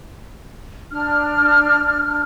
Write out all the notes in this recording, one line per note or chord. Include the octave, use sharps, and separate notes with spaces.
D4 F6